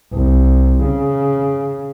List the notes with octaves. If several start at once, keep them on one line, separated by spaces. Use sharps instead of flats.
C2
C#3